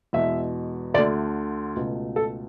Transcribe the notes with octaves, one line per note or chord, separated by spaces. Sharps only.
E2 B2 G#3 E5
D2 D3 A3 D5
C#2 B2 A3
A4